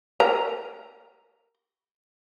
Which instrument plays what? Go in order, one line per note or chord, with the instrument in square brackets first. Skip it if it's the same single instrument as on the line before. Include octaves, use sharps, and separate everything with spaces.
[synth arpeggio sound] A#4 [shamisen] A#5